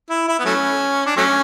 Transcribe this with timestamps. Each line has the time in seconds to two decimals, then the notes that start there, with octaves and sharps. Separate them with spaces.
0.10 E4
0.28 E4
0.39 B3
0.45 F#3 A3 C#4
1.06 D4
1.17 F#3 A3 C#4